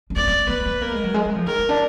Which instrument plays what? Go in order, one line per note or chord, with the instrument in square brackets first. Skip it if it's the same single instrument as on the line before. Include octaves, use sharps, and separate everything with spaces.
[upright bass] D4
[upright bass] B3 [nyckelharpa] D5
[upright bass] B3
[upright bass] B3 [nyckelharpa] B4
[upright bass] B3
[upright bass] A#3 [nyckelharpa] A#4
[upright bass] G#3
F#3
G#3
G#3
F3
[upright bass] D#3 [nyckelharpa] A#4
[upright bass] B3
D4